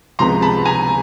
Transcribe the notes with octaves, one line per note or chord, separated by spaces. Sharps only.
C#2 C3 F3 G#3 B3 A#5 C6
A5 B5
G#5 A#5